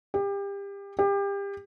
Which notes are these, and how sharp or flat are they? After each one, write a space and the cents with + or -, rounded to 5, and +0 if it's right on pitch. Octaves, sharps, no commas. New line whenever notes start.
G4 +30
G4 +30